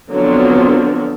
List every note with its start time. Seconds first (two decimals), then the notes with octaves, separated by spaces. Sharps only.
0.11 D3 F3 F#3 B3 C4 D4